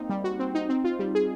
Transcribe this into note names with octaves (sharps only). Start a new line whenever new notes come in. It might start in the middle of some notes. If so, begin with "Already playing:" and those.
Already playing: A#3 C4 D#4
G3
F#4
C4
D#4
C4
F4
G3
G#4